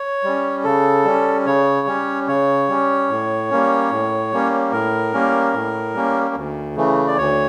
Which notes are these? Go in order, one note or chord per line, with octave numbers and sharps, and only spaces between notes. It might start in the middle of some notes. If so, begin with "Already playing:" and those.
Already playing: C#5
G3 C#4
C#3 A4
G3 C#4
C#3 C#5
G3 C#4
C#3 C#5
G3 C#4
A2
G3 A#3 C#4
A2
G3 A#3 C#4
A2 A#4
G3 A#3 C#4
A2
G3 A#3 C#4
D2
C#3 E3 A3
D5
D2 C#5